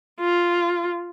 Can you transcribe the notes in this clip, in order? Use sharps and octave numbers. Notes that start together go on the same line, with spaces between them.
F4